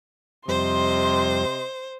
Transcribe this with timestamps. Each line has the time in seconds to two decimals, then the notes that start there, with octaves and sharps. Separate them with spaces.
0.48 F2 C3 G3 C5 D#5 C6